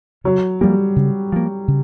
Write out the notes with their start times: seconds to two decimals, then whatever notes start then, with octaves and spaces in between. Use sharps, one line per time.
0.24 C#3 F#3
0.61 F3 G3 A#3
0.96 C#3
1.32 F3 A#3
1.68 C#3